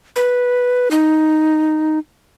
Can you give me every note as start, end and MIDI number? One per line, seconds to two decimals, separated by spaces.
0.16 0.89 71
0.91 1.99 63